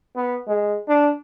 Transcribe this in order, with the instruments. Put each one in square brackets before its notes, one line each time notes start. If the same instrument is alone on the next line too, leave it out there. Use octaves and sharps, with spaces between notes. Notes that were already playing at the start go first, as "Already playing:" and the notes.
[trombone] B3
G#3
D4